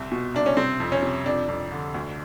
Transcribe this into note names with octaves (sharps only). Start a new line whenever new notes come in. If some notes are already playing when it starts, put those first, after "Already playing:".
Already playing: C2 C4
B2
C2 D4
C#4
C3 C4
F2
C#4
C3
F2 D4
F2
D3
D2